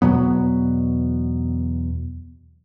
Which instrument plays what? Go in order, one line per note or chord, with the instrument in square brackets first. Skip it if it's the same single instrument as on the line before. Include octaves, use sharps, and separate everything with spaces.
[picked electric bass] E2 B2 F#3 B3